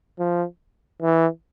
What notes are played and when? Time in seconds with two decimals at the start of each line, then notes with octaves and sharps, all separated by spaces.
0.19 F3
1.02 E3